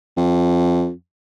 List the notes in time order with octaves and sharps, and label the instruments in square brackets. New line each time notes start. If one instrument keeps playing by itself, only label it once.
[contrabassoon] F2